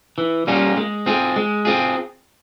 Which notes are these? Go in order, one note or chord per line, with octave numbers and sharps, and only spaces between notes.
E3
G3 A#3 C#4 F4
G#3
C4 F4 G#4
G#3
C4 F4 G#4